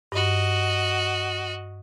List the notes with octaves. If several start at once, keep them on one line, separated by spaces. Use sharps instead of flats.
G2 F#4 D#5